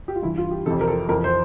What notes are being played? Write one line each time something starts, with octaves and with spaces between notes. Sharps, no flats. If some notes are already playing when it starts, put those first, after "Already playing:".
G4
F4
G2 E3 E4
F4
G4
F2 C3 E3 A4
A#4
A4
F2 E3 A#4
C5